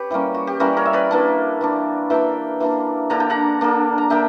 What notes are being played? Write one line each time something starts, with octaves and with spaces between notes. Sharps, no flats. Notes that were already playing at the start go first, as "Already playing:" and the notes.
Already playing: G4 B4 C#5
E3 G3 A#3 C#4
F#4
G4
E3 G3 A#3 C#4 F#4 A#4
A#4 C#5
E5
B4 D5
E3 A#3 D4
E3 A#3 D4
E3 A#3 D4 E5 G5
E3 A#3 D4
D3 A#3 D4 A#5
G5
F#5 A#5
D3 A#3 D4
A#5
D3 A#3 D4 E5 G5